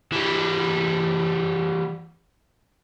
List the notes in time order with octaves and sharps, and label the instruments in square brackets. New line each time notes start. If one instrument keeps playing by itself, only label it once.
[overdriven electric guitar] E3 G3